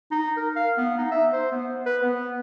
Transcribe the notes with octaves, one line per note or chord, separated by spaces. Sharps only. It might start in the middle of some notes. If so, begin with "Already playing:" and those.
D#4
A#4
F5
B3
D#4
E5
C5
B3
B4
B3